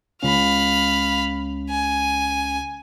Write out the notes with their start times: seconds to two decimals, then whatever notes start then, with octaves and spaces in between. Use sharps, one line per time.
0.23 C#2 C#4 F5 B5
1.70 G#5